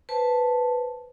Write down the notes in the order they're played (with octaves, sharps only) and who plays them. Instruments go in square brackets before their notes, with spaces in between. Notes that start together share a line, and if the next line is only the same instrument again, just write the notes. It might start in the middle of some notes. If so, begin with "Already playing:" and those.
[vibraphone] B4 C5 A5